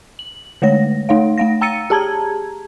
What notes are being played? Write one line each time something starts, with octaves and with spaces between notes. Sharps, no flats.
F#7
D3 G#3 A3 C#5 A#6
A3 D#4 C#5 F5
A3 F5 A#6
G5 A#5 E6 A6 C#7 D#7
G4 G#4 A5 A#5 G#6